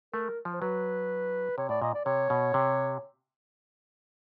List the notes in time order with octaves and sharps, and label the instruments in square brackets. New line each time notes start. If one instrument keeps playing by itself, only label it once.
[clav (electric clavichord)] A3 [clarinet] A#4
[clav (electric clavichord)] F3
[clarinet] C5
[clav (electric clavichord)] F#3 [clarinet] B4
[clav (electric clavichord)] C3 [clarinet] C#5
[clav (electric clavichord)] A2 [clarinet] D5
[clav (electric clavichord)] A#2 [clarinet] D#5
[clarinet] D5
[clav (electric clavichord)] C3 [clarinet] C#5
[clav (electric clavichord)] B2
C3